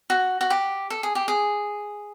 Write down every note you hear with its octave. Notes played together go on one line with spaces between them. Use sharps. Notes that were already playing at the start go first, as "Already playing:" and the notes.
F#4
F#4
G4
A4
G#4
G4
G#4